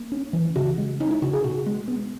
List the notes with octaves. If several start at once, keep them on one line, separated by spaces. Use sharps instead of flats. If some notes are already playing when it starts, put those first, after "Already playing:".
Already playing: A#3
C#4
E3
C#3 F#4
G#3
C#4 D#4
E4
C#3 F#4
G#4
B2 F#4
G#3
B3